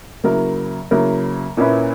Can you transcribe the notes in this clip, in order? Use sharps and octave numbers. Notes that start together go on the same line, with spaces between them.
C#3 F#3 A#3 E4 A#4
C#3 F#3 A#3 E4 A#4
A#2 A#3 C#4 E4 B4